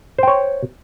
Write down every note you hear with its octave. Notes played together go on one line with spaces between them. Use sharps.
C5 C#5 G5